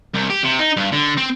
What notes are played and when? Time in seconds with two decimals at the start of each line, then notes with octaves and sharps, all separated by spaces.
0.14 C2
0.30 G4
0.44 C3
0.59 D#4
0.77 G2
0.92 D3
1.17 C4